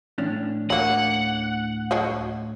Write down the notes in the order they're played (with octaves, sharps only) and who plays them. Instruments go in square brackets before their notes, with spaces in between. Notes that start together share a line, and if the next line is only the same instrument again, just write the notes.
[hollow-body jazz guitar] A2 C#4 D4 [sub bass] E3
[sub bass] D2 [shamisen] F#3 A#3 [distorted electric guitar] F#5
[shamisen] F#3 G#3 F#4